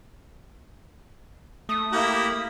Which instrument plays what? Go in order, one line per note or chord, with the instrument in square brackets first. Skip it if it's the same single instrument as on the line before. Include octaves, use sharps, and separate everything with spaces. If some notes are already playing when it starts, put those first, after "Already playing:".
[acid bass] A3 [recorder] D#6
[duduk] A#3 [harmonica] E4 G4 A#4